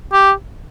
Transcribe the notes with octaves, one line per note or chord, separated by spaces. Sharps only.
G4